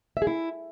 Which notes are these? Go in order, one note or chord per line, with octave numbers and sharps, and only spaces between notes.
E5
G#4
E4